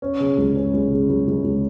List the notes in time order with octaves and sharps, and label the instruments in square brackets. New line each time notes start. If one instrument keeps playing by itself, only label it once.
[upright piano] C#4
C#3
C#2
C#4
C#2
C#3
C#2
C#2
C#2